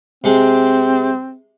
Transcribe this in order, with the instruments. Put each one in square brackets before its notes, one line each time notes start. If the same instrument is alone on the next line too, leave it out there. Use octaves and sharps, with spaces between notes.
[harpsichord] C3 G#3 [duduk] C4